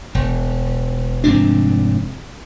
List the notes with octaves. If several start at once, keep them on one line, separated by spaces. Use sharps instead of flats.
E1
F1 G#2 C4 D4